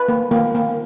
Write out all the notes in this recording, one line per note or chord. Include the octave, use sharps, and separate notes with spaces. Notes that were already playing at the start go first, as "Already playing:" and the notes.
Already playing: B4
A#3
A#3
A#3